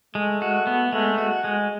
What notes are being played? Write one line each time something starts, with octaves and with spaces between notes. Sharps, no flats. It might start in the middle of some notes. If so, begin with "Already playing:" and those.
G#3 A3
F#4
B3
G#3 A3
F#4
G#3